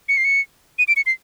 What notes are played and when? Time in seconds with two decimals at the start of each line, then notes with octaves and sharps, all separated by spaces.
0.09 C#7
0.17 C7
0.24 C#7
0.79 D#7
0.88 D7
0.96 C#7
1.06 C7